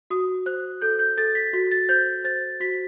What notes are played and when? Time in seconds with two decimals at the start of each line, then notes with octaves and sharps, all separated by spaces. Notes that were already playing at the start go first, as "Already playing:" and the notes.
0.10 F#4 D#6
0.46 C5 F#6
0.82 A4 G6
0.99 G6
1.17 A4 A6
1.35 B6
1.53 F#4 B6
1.71 A6
1.89 C5 G6
2.24 C5 A6
2.60 F#4 B6